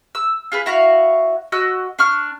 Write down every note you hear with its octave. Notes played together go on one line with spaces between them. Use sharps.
E6
F4 G#4 B4
E4 F#4 C#5 F5
F#4 D#5 E6 F#6
D4 C#6 F6